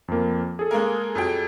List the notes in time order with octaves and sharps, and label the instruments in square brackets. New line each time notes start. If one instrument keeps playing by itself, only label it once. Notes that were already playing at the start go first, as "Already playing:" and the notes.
[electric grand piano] F2 A#3
G#4 A4
[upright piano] G#3 A#3 A#4
F2 F#3 G5